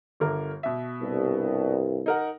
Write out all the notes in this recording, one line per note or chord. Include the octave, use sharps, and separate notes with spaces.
G1 D3 A#4
B2 E5
C2 G2
D#4 A#4 F#5